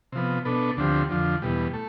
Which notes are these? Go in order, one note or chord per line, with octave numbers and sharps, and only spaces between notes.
C3 F3 B3
B2 B3 D4 A4
D2 D3 F3 C4 G4
F2 D3 F3
E2 B2 G3
A3